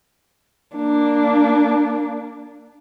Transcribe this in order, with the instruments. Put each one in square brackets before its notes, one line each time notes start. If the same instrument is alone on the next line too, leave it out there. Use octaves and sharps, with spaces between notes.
[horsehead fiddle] A#3 D4